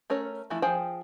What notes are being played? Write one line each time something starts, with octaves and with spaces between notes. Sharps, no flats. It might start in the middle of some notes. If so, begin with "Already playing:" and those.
A3 C#4 A#4 C#5
E3 F3 A3 E4
F3 G#4 C5 G5 G#5